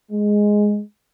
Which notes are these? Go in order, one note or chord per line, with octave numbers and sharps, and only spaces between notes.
G#3